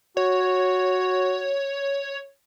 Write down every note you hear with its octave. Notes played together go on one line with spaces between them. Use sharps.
F#4 C#5